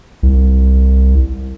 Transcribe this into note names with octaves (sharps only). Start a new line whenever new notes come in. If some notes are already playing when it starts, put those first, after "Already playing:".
C2